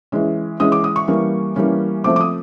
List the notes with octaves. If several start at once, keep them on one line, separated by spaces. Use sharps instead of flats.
E3 G#3 C#4
E3 G#3 C#4 D#6
D6
D#6
C#6
E3 G3 A#3 C#4
E3 G3 A#3 C#4
F3 A3 C4 D6
D6
D#6